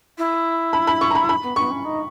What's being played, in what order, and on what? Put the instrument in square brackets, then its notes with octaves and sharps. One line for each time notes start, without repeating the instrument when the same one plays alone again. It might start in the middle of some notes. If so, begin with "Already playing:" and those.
[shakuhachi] E4
[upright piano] B5
B5
C#6
A#5
B5
B5
[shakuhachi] B3
[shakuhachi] B3 [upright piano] C#6
[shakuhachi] C#4
D#4